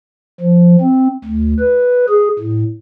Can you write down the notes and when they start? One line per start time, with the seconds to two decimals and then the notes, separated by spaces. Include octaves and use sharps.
0.41 F3
0.81 C4
1.24 D2
1.60 B4
2.09 G#4
2.39 A2